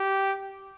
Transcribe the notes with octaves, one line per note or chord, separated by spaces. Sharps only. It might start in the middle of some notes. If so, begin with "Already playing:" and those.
Already playing: G4